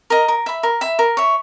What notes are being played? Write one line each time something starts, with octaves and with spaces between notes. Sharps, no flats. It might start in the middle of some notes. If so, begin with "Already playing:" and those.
A#4 D#5 A#5
A#4
E5 B5
A#4
E5 B5
A#4
C#5 E5